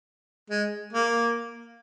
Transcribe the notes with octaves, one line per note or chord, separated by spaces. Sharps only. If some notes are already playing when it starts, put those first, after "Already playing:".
G#3
A#3